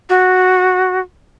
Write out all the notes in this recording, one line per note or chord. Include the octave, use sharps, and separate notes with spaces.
F#4